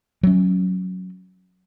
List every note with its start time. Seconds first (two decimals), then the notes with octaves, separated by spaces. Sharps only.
0.23 F#3 C#4